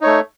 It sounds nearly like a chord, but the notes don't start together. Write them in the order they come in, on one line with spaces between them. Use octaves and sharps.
D#4 C#5 A3